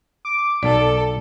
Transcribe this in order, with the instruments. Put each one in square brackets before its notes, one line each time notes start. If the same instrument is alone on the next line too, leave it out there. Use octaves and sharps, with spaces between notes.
[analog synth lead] D6
[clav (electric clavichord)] B1 [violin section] A4 [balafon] D5